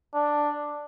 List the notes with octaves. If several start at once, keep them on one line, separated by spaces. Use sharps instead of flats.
D4